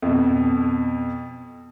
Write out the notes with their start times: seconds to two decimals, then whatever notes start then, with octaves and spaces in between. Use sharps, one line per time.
0.02 F2 B2